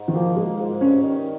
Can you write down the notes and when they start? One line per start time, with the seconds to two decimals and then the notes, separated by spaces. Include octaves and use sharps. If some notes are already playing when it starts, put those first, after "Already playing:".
Already playing: G#2
0.08 D#3
0.14 F3 A#3
0.37 G#2 G#3
0.58 G#2 F4
0.81 G2 C#4
1.02 D#3